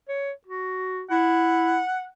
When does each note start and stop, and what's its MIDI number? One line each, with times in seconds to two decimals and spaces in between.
0.08 0.31 73
0.46 1.03 66
1.11 1.80 64
1.11 2.05 78